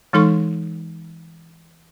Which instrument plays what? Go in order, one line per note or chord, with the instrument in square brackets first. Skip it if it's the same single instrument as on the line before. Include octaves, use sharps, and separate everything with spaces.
[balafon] E3 G#3 D#4 A4 C6 C#6